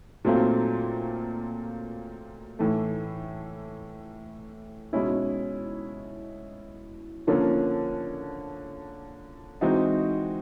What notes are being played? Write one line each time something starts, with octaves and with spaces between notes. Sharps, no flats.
A#2 F#3 A3 C4 F4
A2 E3 A3
B2 G#3 C#4 E4
D3 F3 A#3 C#4
E3 G#3 C4 D#4 F#4